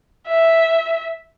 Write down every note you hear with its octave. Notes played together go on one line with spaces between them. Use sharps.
E5